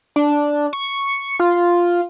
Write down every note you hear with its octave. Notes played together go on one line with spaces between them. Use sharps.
D4
C#6
F4